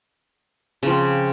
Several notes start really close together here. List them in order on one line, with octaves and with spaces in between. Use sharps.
C#3 F3 C4